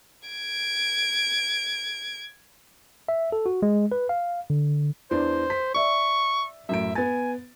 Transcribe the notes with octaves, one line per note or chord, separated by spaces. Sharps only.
G#6 D7
E5
A4
F#4
G#3
B4
F5
D3
E2 D4 C5
B6
D5 E5 C#6
F#2 A2 E5 D7
B3 G#5 A6